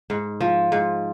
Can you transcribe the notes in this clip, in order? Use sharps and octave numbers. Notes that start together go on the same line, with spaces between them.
G#2
F3
G#2